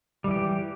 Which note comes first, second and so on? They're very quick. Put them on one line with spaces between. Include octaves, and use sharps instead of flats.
G3 E3 G4